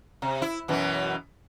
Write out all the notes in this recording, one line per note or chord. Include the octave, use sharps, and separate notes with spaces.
C3
E4
F#2 B2 E3